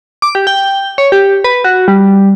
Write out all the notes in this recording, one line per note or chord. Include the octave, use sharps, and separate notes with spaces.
D6
G4
G5
C#5
G4
B4
F#4
G3